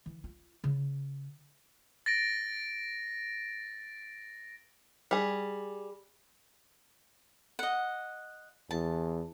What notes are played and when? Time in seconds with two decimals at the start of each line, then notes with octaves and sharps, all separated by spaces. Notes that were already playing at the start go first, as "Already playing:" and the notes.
0.06 E3
0.24 F4
0.64 C#3
2.06 A6 A#6 D7
5.11 G3 G#4
7.59 D#5 F#5
8.71 E2 A5